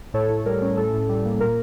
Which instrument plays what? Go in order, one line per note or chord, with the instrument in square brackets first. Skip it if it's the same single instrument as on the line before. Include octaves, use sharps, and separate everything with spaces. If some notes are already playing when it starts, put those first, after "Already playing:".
[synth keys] A2 A4 C#5
A2
G3 A#4
C#4
A2 A4
A2
G3
A#3
A#2 A#4